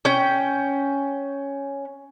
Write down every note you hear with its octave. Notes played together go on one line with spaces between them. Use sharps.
C#4 G5